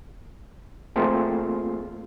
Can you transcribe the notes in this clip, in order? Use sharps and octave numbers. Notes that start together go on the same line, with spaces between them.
A3 A#3 C4 F4 G#4